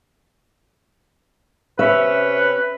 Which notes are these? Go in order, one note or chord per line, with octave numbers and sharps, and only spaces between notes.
C3 C#4 B4 E5